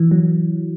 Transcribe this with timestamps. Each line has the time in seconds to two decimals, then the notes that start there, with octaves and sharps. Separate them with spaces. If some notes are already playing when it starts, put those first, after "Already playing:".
Already playing: E3
0.11 F#3